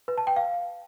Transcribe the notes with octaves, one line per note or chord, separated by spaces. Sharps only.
B4
A5
G5
F5